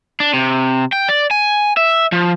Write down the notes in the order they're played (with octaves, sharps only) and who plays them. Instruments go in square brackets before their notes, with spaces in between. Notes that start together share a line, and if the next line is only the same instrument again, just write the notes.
[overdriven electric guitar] D4
C3
G5
D5
G#5
E5
F3